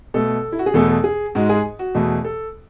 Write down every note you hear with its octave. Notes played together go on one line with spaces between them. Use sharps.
B2 A3 A4
E4
F#4
G#4
E2 B2 A3 A4
A4
G#4
G#2 G#3 F#4
G#4
F#4
E2 B2 A3
A4